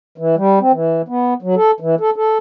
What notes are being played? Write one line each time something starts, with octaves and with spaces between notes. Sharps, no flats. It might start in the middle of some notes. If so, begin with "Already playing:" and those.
E3
G3
C4
E3
B3
F#3
A4
E3
A4
A4